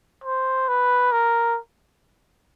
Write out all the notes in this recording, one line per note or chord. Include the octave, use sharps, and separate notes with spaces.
C5
B4
A#4